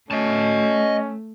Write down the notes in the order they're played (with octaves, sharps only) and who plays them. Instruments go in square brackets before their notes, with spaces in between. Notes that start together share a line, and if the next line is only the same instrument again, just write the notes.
[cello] A3 [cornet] C#4 [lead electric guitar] D#5 A5